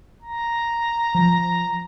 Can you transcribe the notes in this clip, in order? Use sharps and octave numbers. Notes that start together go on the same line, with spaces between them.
A#5
F3